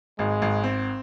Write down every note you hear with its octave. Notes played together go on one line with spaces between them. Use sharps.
G#1 G#3
G#1
C4